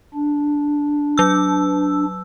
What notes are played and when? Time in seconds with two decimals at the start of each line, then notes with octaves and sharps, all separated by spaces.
0.14 D4
1.18 F#3 E6